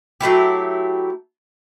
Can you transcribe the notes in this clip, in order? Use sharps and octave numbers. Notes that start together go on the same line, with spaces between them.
F#3 A3 E4 G4